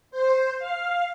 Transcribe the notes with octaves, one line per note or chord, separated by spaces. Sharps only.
C5
F5